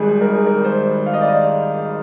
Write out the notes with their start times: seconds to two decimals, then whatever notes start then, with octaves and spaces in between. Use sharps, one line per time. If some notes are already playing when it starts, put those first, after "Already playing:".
Already playing: G#1 G#2 D#3 G3 G#4
0.21 A#4
0.34 G#4
0.46 A#4
0.64 C5
1.06 F5
1.13 D#5
1.21 D5
1.28 D#5